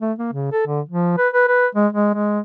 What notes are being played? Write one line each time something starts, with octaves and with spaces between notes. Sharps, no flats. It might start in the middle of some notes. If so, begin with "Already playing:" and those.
A3
A#3
C#3
A4
D3
F3
B4
B4
B4
G#3
G#3
G#3